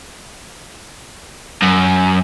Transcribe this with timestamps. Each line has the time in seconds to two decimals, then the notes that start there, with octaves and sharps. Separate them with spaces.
1.62 F#2